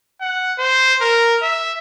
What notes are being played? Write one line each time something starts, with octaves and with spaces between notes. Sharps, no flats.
F#5
C5
A#4
E5